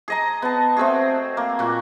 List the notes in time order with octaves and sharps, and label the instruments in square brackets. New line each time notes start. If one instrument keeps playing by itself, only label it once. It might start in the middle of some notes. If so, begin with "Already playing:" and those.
[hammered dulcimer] G#4 D#5 A#5
B3 A5
A3 C4 F#4 G#4
A#3
A#2 F#4